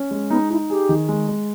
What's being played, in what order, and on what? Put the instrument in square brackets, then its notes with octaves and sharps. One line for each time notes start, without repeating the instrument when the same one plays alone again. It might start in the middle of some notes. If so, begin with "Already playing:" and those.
Already playing: [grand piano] C#4
G#3
[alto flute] B3 [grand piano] D#4
[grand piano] D#4 [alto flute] E4
[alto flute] G4 [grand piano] G#4
[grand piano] D#3
G#3
G#3